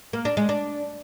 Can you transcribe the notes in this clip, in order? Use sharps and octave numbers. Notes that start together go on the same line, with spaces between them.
A#3
D4
G#3
D4